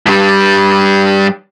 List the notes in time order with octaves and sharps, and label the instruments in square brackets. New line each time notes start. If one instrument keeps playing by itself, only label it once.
[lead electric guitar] G2 G3